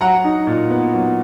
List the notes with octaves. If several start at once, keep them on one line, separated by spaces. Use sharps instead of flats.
F#3 F#5 A#5
D#4
A#2
B3
F#3